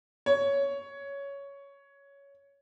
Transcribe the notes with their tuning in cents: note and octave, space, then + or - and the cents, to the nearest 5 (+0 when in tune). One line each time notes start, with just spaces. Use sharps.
C#5 +10